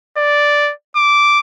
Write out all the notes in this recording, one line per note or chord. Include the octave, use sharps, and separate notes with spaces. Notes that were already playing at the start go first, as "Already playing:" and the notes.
D5
D6